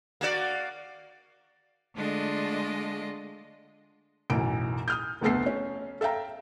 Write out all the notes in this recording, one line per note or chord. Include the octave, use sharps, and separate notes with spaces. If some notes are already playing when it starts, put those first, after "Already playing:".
A#3 F#4 D5
D3 G#3 A3 D4 F4 D#5
B1 F#2 A2 E3 D7
D#6 F6 G6
F1 D2 A3 B3 A4 C7
C#4
A4 E5 F5 G5 A#5